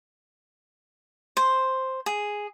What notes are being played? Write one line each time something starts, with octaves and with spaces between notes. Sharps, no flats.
C5
G#4